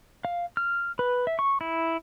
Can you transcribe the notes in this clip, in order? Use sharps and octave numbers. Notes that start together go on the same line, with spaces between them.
F5
F6
B4
E5
C#6
E4